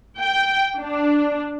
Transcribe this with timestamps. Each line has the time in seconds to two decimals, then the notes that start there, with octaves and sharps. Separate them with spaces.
0.19 G5
0.79 D4